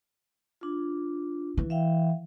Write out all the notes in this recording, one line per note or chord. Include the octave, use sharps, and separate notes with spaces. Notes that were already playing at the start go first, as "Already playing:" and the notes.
D4 F4
E3
E5 F5 G5